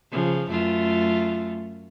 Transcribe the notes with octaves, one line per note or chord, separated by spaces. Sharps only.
C#3 F3
F#2 A3 F4